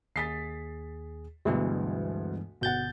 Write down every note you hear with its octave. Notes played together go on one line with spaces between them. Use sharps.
D#2 G#4 A6 B6 C7
D2 G2 B2 E3 G#3
G1 B2 F#5 G6 A6